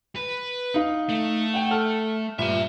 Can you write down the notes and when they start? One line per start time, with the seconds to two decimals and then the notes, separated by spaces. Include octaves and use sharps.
0.16 B4
0.74 D#4 F5
1.09 A3
1.54 F#5 G5
1.71 A4 F6
2.39 G2 A#2 E5 A#5 E7